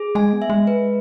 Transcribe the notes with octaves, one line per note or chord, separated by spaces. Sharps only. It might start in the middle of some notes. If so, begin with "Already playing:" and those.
Already playing: G#4
G#3 G#5
B3
E5
G#3
B4